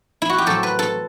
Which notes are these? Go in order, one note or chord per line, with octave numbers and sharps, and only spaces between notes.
E4
F#4
G4
A2 F#3 C4 A4
B4
A4